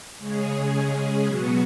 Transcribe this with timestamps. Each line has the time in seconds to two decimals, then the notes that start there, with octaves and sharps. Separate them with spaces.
0.19 C#3 G#3 C#4 G#4
1.26 B2 F#3 B3 F#4